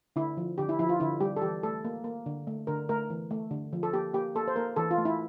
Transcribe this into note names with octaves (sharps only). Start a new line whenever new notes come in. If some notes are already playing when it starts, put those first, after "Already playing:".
D3 E4
F3
D3 G4
E4
F3 E4
F4
D3 E4
G3 G4
A4
E3 G4
A3 A4
A#3
A#3
D3
A3
D3 A#4
A3 A#4
E3
A3
D3
F3
A4
A#3 G4
A#3 G4
A#3 A4
C5
A#3 A#4
E3 A4
F4
A3
E4